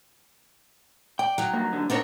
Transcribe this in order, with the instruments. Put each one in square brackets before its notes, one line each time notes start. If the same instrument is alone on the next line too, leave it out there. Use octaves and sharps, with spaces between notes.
[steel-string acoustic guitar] D5 [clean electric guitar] G5
[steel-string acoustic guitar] F#3 D#4
[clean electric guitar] G2 A#3
D#2 D3
[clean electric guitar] B3 C4 A#4 [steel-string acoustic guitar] D4 D#4 C#5